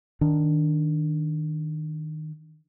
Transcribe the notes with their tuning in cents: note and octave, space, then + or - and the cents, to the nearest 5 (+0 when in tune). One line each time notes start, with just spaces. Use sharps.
D#3 +0 D4 +0